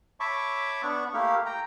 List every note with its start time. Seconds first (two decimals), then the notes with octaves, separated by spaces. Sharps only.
0.20 C#5 E5 A5 B5 C#6 D6
0.83 B3 D4 F#5 C#6
1.14 A3 A#3 E4 G4 F5
1.46 G5 A#5